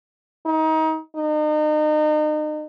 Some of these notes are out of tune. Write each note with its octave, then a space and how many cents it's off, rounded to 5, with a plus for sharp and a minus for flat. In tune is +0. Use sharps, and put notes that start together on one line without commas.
D#4 +30
D#4 -35